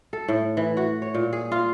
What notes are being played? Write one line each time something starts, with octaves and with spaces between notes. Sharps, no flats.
A4
A2
E3
F#4
C#5
A#2
G#4
F4